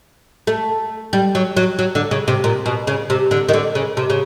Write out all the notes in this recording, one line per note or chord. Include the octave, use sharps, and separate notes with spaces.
A3
G3
F#3
F#3
F#3
D3
C#3
C3
A#2
B2
C#3
C3
D3
D#3
D3
C#3
C3
C#3